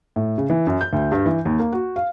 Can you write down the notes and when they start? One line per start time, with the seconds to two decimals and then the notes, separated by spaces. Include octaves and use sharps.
0.16 A2
0.38 C#3
0.50 E3
0.67 F#2
0.81 G6
0.93 D2
1.12 G2
1.26 E3
1.45 D#2
1.59 A#3
1.72 F#4
1.96 F5